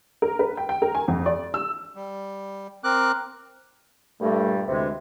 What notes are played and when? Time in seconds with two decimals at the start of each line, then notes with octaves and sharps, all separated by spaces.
0.22 A#4
0.39 B4
0.57 G5
0.69 G5
0.82 A#4
0.95 G#5
1.08 F2
1.26 D5
1.54 E6
1.95 G3
2.84 C4 A#4 D6 F#6
4.21 G2 A#2 G3 A3
4.68 D2 C3 E3 G#3